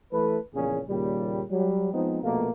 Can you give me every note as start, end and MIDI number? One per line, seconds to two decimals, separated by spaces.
0.11 0.38 52
0.11 0.38 57
0.11 0.38 69
0.11 0.38 71
0.54 0.80 34
0.54 0.80 40
0.54 0.80 46
0.54 0.80 49
0.54 0.80 61
0.54 0.80 68
0.88 1.42 39
0.88 1.42 46
0.88 1.42 49
0.88 1.42 55
1.50 1.90 54
1.50 1.90 55
1.93 2.22 53
1.93 2.22 56
1.93 2.22 59
1.93 2.22 60
1.93 2.22 63
2.23 2.49 34
2.23 2.49 47
2.23 2.49 57
2.23 2.49 58